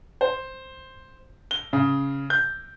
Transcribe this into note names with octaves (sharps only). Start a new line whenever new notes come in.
C5
G7
C#3
G6